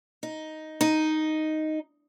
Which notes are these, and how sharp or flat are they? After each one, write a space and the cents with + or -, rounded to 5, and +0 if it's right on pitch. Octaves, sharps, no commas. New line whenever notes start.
D#4 +5
D#4 +0